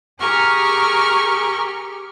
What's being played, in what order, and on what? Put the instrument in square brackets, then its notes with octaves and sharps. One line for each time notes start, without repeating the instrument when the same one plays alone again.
[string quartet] G4 G#4 A#4 C#6 F6